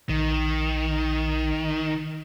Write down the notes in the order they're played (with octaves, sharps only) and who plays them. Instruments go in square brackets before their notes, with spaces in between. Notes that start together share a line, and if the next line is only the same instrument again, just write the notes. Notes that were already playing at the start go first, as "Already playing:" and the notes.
[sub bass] A#1 [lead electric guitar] D#3